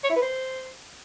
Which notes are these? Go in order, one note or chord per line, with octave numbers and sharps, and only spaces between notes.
C#5
E4
B4
C5